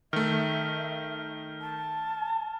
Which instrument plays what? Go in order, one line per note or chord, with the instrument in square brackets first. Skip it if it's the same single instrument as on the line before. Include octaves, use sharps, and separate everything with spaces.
[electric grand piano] D#3 A3 [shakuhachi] E5 [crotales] F6
[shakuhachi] A5